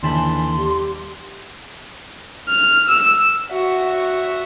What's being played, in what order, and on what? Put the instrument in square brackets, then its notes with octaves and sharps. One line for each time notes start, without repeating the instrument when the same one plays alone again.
[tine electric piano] D#2 A5 B5 [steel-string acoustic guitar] D3 E3 [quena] C6
[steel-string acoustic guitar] G2 [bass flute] G4
[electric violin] F6
E6
[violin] F#4 E5